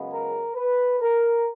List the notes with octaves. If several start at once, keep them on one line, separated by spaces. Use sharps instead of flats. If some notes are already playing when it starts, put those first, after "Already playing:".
Already playing: F#2 C#3 G#3 B3
A#4
B4
A#4